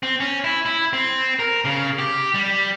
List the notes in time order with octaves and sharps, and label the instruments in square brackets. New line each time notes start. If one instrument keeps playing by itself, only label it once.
[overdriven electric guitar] C4
C#4
E4
E4
C4
A#4
C#3
G4
G3